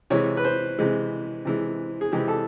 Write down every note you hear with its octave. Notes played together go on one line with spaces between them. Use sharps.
C3 E3 G#3 C#5
B4
C5
C3 E3 G#3
C3 E3 G#3
G#4
C3 E3 G#3 G4
A4